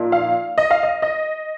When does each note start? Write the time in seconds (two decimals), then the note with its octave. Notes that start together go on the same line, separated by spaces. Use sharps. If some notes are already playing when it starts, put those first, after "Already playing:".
Already playing: A#2 F3 D#4
0.12 F5
0.58 D#5
0.71 F5
0.83 D#5
1.02 D#5